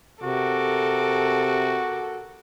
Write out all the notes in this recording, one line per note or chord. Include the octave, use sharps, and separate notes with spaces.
C3 F#4 A4 A#4 D6